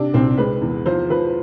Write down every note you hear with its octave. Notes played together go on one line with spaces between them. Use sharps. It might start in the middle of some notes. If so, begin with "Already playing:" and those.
Already playing: C3 D4
C2 C4
G#3 B4
E2
F3 C5
F3 B4